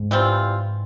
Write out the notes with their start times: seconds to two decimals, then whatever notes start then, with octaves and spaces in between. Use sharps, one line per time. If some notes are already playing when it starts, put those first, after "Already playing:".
Already playing: G#2
0.11 E3 G3 C4 F4